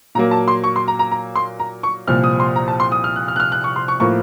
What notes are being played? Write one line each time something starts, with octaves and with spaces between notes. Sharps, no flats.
A#2 F#3 A#3 A#5
A5
C6
C#6
C6
A#5
A#5
A#5
C6
A#5
C#6
C2 A#2 F3 F6
D#6
C6
A#5
A5
C6
D#6
F6
F#6
F6
F#6
F6
F#6
C#6
C6
C#6
A2 F3 A#3 C#6